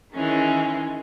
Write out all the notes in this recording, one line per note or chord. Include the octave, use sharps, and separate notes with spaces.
D#3 E3 G#3 C#4